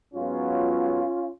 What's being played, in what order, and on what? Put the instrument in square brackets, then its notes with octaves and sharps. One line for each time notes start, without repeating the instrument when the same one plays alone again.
[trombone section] G#2 F#3 B3 C#4 F4